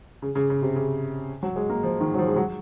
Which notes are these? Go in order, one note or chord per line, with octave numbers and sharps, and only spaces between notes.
C#3
C#3
C#3
C3
C#3
F#3
G#3
A#3
F3
D#3
F#3
F3
G#3
F#3